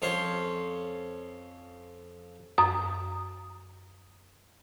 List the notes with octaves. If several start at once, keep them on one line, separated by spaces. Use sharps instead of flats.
F2 C#4 C5 C6
F#2 D#6